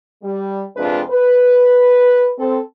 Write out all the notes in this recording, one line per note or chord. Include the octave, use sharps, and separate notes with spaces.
G3
F2 C3 G#3 D4 F4 B4
B4
C4 A4